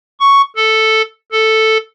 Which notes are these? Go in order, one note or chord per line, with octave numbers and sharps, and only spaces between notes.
C#6
A4
A4